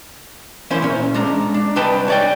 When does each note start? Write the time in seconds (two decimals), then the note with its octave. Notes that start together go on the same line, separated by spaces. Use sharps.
0.70 E3 A#3 C#4 E4 C5
0.82 A#2 C#4
1.14 G#3 D4 A#5
1.54 D4
1.76 C2 D#4 B4 G5 A5 B5
2.08 C#5 D5 G5